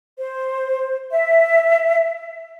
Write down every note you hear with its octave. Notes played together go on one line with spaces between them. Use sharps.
C5
E5